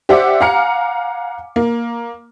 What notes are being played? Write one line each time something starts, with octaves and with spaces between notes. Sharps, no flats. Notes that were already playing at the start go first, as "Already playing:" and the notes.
G4 C5 D5 E5 F#5 D6
F5 F#5 G#5 A#5 F6 C#7
A#3